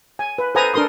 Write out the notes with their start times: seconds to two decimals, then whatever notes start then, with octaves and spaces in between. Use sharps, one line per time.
0.19 G#5
0.38 B4
0.55 A4 B4 C5 G#5 A#5 D#6
0.74 D4 A4 A#4 C6 D#6